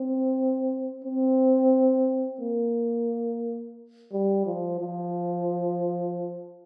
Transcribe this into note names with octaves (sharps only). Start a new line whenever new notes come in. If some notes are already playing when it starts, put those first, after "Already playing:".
Already playing: C4
C4
A#3
G3
F3
F3